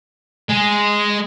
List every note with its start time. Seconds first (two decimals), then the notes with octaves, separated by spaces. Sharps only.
0.49 G#3 G#4